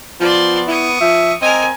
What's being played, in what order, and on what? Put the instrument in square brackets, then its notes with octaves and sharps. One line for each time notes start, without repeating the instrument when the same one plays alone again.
[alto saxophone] F3 [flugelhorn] B3 [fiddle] D5 C6
[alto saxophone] E4 [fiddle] C#6 D#6
[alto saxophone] F3 [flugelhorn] E5
[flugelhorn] C4 [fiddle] A#4 G#5 [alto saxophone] D#5